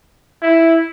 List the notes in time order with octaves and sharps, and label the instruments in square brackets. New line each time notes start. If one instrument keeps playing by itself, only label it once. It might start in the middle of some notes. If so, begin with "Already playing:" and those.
[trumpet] E4